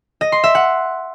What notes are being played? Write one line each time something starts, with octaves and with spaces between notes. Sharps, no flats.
D#5
C6
E5
F#5